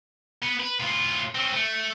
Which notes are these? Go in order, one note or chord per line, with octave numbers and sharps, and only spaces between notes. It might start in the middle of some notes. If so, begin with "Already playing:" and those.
B3
B4
A2 F4
C4 C#4
A3